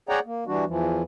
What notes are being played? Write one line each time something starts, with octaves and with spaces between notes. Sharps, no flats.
G#4 C#5 D5 F#5 G5 A#5
A#3
E3 G3 D4 F#4
E2 E3 F3